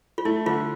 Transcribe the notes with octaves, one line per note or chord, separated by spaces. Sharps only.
F4
A3 E4
D3 F4